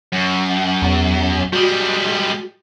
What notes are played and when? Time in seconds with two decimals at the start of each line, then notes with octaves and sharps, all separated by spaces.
0.12 F#2
0.82 E2
1.53 G3 G#3 F#4